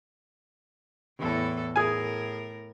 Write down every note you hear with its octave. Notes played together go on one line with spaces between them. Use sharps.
E2 A2 A4
A2 G#4 A#4 G#5